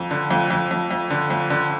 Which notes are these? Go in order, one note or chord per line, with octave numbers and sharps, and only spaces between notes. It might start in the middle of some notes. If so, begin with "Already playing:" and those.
Already playing: F2
D3
F2
F2
F2
F2
D3
F2
D3